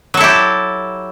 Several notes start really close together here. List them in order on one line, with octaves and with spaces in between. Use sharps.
F#3 A4 E4 G4